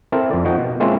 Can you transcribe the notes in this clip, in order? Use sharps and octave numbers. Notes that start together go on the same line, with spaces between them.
C4 E4 A4 A#4
F2 D5
F3 D#4 F#4 G5
B2
G#3 A#3 C4 C#4 E4 F4